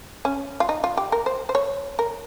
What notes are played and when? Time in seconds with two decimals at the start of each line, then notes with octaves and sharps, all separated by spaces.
0.25 C#4
0.60 F4
0.69 D#4
0.84 F4
0.97 G4
1.12 A#4
1.26 C5
1.49 C5
1.55 C#5
1.99 A#4